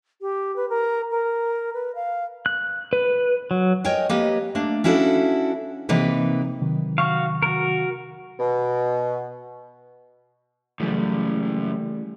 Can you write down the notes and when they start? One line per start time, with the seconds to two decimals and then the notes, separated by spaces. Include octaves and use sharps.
0.21 G4
0.56 B4
0.69 A#4
1.11 A#4
1.74 B4
1.95 F5
2.46 F#6
2.93 B4
3.51 F#3
3.84 A#4 C#5 D#5 G5 G#5
4.09 A#3 G4 B4 D#5
4.55 A3 A#3 D4
4.84 C#4 D4 E4 F#4 A4 F5
5.89 C3 E3 A#3 D#4 B4
6.62 C3 D#3 F#3
6.98 F#4 F5 C#6
7.43 F#4 A#4
8.40 B2
10.80 F#2 C#3 E3 G3 A3